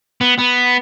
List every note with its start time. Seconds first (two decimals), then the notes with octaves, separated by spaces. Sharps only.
0.21 B3
0.38 B3